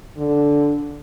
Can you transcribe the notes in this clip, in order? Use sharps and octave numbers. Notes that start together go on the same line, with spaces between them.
D3